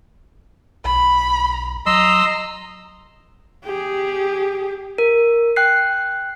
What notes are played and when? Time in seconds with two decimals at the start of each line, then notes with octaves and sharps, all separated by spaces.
0.84 B1 B5
1.86 F#3 D#5 A#5 C6 E6
3.65 G4 G#4
4.98 A#4
5.56 G5 F#6 C7